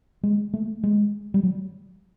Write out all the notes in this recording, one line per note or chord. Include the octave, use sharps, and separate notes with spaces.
G#3
A3
G#3
G3
F#3